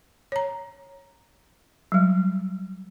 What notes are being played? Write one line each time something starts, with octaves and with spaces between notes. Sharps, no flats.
C#5 A#5
F#3 G3